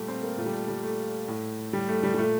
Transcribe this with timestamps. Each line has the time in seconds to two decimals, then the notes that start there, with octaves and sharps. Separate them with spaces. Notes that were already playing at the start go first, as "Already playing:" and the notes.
Already playing: A#2 G3 A3
0.08 C4
0.23 A#3
0.38 A#2 A3
0.46 G3
0.53 A3
0.68 G3
0.83 A3
1.28 A2
1.73 G3
1.88 A3
2.03 G3
2.14 G3
2.18 A#2 A3